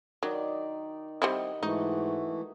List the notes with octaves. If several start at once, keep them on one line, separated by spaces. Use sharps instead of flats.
D#3 F#3 D#4 D5
G3 C4 E4 D#5 F#5
G#2 E3 A3 D#4 F#4